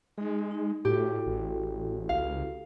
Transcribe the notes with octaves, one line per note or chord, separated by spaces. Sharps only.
G#3 D#4 G#4
D#4
A2 E4 F#4 G4 A4
A1
C#2 F5